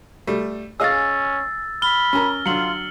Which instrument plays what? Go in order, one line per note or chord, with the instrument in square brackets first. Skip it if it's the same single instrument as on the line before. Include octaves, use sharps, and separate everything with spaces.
[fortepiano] G3 A3
[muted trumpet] C#4 [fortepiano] G#4 D#5 F5 [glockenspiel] E6 A6
[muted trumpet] B5 [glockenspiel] F6 G7
[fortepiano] C#4 A#4
[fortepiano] D3 F#3 [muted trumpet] F4 [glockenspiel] C#7 F#7